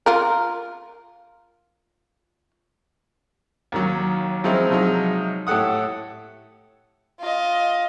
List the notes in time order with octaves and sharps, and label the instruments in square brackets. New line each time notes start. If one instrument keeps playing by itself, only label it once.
[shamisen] F4 A#4
[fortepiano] D#2 D#3 F#3
F3 F#3 G#3 C4 D#4 E4
C3 F3 F#3 G#3 D#4
A2 G4 A4 F#5 D#6
[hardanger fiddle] F4 D#5